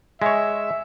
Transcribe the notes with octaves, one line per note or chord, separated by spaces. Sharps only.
G#3 C#5 E5